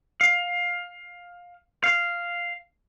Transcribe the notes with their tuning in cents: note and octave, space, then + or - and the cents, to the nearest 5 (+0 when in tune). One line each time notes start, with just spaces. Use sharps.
F5 +15
F5 -5